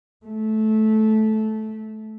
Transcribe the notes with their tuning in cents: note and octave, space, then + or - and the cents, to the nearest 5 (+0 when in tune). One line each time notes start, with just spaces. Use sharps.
A3 -15